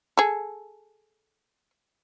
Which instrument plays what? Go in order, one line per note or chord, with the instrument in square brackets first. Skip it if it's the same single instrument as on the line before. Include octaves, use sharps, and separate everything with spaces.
[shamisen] G#4 A4